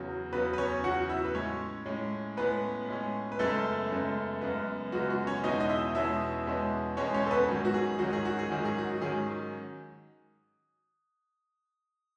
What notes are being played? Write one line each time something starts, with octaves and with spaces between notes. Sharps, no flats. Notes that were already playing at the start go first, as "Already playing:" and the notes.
Already playing: E2 C#3 F#3
E2 C#3 F#3 B3 B4
B4
C#4 C#5
E2 C#3 F#3 F#4 F#5
E4 E5
B4
A2 G#3 C#4 C#5
A2 G#3 C#4
A2 G#3 B3 C#4 B4
A2 G#3 C#4
B4
F#2 C#3 G#3 A3 B3 A4
F#2 C#3 G#3 B3
F#2 C#3 G#3 B3
F#2 C#3 G#3 B3 F#4
F#4
C#4 C#5
E2 B2 G#3 C#4 D#4 D#5
D#5
E4 E5
E2 B2 G#3 C#4 E4 E5
E2 B2 G#3 C#4
E2 B2 G#3 C#4 C#5
C#4 C#5
A4
B3 B4
G#2 D#3 F#3 C#4
F#4
G#4
G#2 D#3 F#3 C#4 F#4
G#4
F#4
G#4
G#2 D#3 F#3 C#4 F#4
G#4
F#4
G#2 D#3 F#3 C#4 G#4